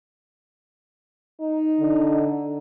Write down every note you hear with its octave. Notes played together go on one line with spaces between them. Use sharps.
D#4
D3